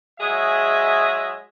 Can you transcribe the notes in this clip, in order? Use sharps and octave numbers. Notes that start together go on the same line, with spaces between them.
F#3 G#3 G#4 D#5 E5